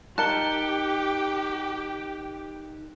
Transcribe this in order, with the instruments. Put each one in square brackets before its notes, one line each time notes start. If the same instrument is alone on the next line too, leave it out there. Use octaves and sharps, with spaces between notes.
[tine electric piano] D#4 A#4 [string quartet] G4 [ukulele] A5 [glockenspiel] F#6 C#7 G7